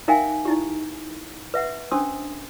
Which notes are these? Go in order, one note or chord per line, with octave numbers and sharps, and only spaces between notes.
D#4 A#4 E5 F5 G5 G#5
D#4 E4 G4
B4 E5 F#5
C#4 D4 C5 C6 D#6 E6